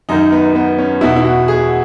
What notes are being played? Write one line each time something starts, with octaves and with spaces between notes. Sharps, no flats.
F#2 D#3 D#4
B3
B3
C#4
E2 B2 E4
E4
F#4
G#4